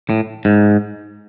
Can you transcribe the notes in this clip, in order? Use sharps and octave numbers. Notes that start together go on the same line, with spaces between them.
A2
G#2